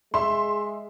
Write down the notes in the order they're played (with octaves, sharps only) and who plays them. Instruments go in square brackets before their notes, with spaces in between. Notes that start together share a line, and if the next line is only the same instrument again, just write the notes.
[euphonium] G#3 [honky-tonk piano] E5 C6